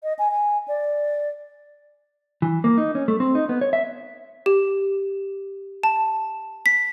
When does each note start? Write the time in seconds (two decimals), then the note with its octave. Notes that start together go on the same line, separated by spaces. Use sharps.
0.03 D#5
0.19 G#5
0.31 G#5
0.68 D5
2.42 E3
2.64 A#3
2.78 D#4
2.95 C#4
3.08 A3
3.20 C4
3.35 D#4
3.49 B3
3.61 C#5
3.73 E5
4.46 G4
5.83 A5
6.66 B6